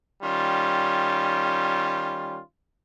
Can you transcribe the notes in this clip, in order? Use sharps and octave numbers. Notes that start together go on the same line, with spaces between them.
D#3 G3 C#4 F4